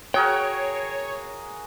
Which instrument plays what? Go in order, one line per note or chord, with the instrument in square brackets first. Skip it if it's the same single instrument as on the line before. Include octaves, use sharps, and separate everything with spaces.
[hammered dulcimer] F#4 G#4 A#4 [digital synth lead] C#5 [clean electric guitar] G5